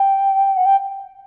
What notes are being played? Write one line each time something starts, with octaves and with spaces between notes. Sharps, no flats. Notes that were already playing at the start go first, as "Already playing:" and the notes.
Already playing: G5
F#5
G5